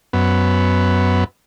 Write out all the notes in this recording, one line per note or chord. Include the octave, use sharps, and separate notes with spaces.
F#2 B3